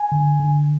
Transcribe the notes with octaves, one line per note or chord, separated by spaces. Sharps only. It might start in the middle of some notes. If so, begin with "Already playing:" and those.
Already playing: G#5
D3
D3